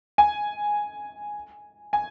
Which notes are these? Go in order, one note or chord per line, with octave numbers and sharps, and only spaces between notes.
G#5
G#5